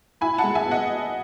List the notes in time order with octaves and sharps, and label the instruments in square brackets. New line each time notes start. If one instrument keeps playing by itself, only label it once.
[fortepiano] E4 [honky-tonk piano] G#5 B5
[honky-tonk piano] F#5 A5
[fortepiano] G#3
[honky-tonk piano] E5 G#5
[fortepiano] B3
[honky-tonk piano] D#5 F#5